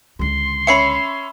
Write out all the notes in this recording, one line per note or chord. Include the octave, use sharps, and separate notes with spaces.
C#2 D3 C6
C#4 C#5 E5 B5 C7 C#7